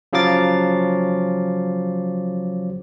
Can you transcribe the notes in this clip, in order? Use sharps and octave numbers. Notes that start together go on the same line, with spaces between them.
C#3 F3 F#3 F5 D6 A6